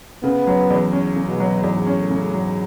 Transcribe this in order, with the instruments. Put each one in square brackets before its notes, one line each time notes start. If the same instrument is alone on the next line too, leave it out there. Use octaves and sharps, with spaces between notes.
[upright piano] C#3 [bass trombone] B3
[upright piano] F#3
E2
C#4
C#3
[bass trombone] B2
[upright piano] F#3
[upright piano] E2 [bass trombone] G#2
[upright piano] C#4
[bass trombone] A2
[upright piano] C#3
[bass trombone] G#2 [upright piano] F#3